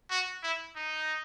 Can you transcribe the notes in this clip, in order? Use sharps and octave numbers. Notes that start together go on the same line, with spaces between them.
F#4
E4
D#4